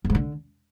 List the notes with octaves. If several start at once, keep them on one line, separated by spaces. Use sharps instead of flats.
F2
G#2
D3